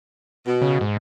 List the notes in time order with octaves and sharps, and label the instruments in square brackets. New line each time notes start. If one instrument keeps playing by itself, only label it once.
[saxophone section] B2
[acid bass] C#3
G#2